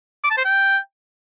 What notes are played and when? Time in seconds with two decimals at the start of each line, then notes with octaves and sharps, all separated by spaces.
0.24 D6
0.31 A5
0.38 C5
0.45 G5